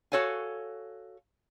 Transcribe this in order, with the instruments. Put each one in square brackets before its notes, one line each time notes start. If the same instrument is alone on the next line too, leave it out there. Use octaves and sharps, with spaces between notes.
[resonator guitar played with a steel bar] F#4 A4 C#5 F5 G#5